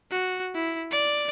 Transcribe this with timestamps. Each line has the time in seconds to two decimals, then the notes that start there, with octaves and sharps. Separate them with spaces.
0.11 F#4
0.55 E4
0.92 D5